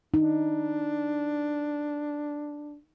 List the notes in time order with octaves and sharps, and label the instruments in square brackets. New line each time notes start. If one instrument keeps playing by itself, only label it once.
[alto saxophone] D4 [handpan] D#4